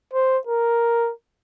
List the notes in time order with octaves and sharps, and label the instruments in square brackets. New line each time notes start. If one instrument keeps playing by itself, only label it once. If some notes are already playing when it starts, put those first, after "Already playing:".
[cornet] C5
A#4